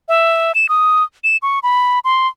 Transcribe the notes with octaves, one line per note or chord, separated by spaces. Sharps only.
E5
E7
D#6
E7
C#6
B5
C6